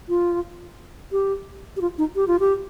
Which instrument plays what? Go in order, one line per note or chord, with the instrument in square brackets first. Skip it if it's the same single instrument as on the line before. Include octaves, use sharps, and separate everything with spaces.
[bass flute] F4
G4
G4
F4
D#4
G4
F4
G4